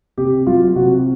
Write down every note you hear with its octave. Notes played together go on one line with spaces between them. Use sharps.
C3 G4
F#3 F4
C3 F#4